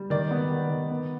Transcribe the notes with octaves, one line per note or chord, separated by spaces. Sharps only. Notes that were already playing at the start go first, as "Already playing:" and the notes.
Already playing: G3
D#3 D5
B3
D#3
D#3
B3